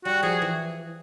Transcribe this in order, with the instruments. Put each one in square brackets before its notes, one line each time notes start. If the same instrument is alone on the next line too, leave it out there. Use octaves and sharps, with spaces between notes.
[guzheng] G3 [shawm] F#4
[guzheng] F3 [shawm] G#4
[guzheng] E3